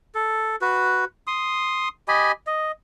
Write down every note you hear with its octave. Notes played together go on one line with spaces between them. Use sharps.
A4
F#4 B4
C6 D#6
G4 D#5 G#5 B5
D#5